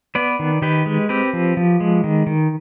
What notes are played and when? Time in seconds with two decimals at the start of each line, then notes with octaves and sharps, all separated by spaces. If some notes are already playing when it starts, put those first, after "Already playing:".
0.15 B3 B4 D5
0.39 D#3
0.62 D#3 G4 B4
0.86 G#3
1.09 C4 G4 B4
1.33 F3
1.57 F3
1.80 G#3
2.04 D#3
2.27 D#3